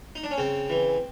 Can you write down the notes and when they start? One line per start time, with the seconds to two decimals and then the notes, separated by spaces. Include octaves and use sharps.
0.15 D#4
0.24 D4
0.31 C#4
0.38 C#3 C4
0.70 E3